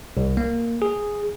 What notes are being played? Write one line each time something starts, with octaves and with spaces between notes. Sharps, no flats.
C2
A#3
G#4